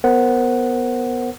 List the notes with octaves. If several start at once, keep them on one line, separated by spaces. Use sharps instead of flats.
B3 A#4 C5 F#5